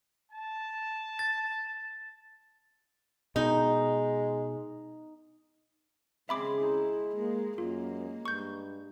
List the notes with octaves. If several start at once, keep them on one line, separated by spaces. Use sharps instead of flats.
A5
A6
B2 G#3 D#4
C#3 G#3 C4 G#4 E5 B5 C6 D6
D#4 E4
G#3 A#3
F#2 A#3 F4
G2 C#6 G6